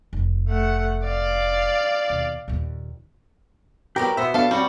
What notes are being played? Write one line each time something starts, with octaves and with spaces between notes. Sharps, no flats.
F1
A3 F#5
D5 F5
D#2 B2
D#2 A#2
F#3 G3 B3 G4 A#4
B2 B3 C5 E5
B3 D4 A4 F5
G3 C4 C#4 F#4